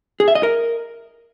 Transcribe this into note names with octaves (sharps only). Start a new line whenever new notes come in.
G#4
E5
D#5
A#4